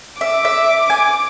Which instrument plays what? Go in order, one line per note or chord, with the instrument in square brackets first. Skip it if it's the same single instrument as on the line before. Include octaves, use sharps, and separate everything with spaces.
[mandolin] E5 [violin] D6
[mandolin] E5
G#5